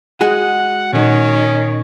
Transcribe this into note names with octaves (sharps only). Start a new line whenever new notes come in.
G#3 F#4 G#4 F#5
A#2 D#3 C#4